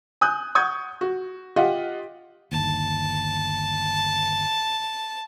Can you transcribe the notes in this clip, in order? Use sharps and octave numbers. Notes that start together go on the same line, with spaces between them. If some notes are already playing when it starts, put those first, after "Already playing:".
G#5 D#6 F#6 G6
F#5 C#6 D#6 G6 G#6
F#4
F4 G4 D#5 F5 F#5
G1 D#2 A5